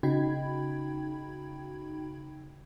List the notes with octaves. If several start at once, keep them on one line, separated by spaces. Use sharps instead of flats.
C#3 D#4 F#4 G5 B5 G#6